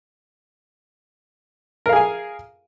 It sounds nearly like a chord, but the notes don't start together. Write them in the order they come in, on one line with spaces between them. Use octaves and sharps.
A#4 F5 G#4 G#5